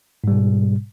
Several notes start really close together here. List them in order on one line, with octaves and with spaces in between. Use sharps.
G#2 G3 B2